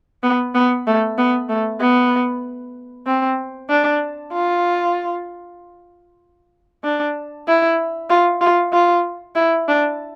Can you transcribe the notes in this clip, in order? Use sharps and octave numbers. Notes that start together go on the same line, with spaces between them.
B3
B3
A3
B3
A3
B3
C4
D4
F4
D4
E4
F4
F4
F4
E4
D4